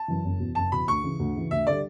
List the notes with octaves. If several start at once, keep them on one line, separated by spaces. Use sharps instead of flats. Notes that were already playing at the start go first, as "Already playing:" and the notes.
Already playing: A5
F#2 E3
F#1
E2 B2
F#1 A5
E2 B2 B5
D2 C#6
C#3 E3
D2
C#3 E3
D2 E5
D3 G3 D5